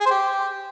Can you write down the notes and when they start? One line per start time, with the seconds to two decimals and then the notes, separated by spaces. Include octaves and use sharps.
0.01 G#4
0.06 C5
0.11 G4